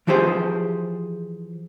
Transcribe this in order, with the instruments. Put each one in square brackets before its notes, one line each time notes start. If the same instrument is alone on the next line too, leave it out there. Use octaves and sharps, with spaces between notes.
[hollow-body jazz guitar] E3 F3 G4 G#4 C5